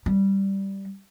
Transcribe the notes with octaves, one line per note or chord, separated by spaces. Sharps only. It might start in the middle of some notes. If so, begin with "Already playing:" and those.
G3